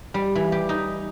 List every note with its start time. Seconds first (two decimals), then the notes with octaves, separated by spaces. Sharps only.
0.14 G3
0.35 E3
0.52 G4
0.69 D#4